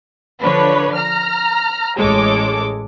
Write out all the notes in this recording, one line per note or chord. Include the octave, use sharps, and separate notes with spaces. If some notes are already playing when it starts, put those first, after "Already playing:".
D3 F3 D4 B4 C#5
A#5 F6
A1 G#3 A4 C#5 D6